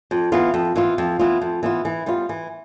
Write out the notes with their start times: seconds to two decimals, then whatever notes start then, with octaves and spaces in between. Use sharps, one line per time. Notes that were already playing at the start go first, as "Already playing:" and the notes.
0.11 F2
0.32 E3 B3 F4
0.54 F2
0.76 E3 B3 F4
0.98 F2
1.19 E3 B3 F4
1.41 F2
1.63 E3 B3 F4
1.85 E3
2.06 G3 B3 F4
2.29 E3